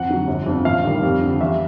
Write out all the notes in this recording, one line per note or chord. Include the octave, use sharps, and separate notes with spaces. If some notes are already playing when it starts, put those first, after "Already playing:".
Already playing: F2 F#5
D3 F#3
G1
F2 D3 F3
A1 F5
G2 D#3 G3
F2
D3 G3
E2 E5